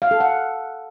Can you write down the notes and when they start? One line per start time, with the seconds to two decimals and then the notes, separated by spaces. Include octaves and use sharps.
0.02 F5
0.11 A4
0.20 F#5